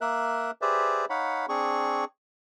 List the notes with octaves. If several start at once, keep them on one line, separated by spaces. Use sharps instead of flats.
A#3 A#4 E5 F#6
G4 G#4 B4 C5 D5 E5
D#4 C#5 F5 F#5 B5
C4 D4 G#4 C#6